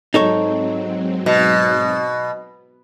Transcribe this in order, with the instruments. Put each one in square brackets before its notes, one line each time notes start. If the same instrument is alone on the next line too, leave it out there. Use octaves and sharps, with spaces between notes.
[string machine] G#2 F#3 C4 [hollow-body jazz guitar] D#4 A4 C#5
[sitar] B2